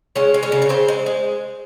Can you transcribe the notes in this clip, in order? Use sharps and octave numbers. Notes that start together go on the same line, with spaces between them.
G#3 C#4 C#5
G#3
C#4 C#5
C#3
C#5
C#3 C4 C5
G#3
G#3